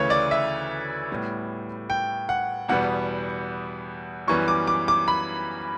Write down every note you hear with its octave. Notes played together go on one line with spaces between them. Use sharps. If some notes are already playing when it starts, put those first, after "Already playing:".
Already playing: D2 C#3 E3 A3 B4 C#5
D5
E5
A2 G3 B3
G5
F#5
E2 B2 G3 B3 F#5
F#2 E3 G3 B3 C#6
D6
D6
D6
B5